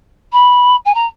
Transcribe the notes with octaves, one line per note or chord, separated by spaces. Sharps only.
B5
G#5
A#5